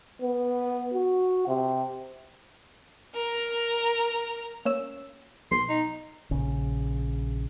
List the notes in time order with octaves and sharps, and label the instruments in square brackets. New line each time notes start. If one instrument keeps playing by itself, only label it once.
[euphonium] B3
F#4
C3
[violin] A#4 A#5
[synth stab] A#3 C#4 E6
[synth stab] B1 [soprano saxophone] C6
[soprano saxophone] D#4
[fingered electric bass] A#1 C#3